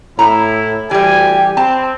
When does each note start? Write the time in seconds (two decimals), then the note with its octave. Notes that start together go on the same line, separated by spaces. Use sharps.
0.19 A2 E4 A#5
0.91 D2 E3 G3 G4 G5 G#5
1.57 C4 A5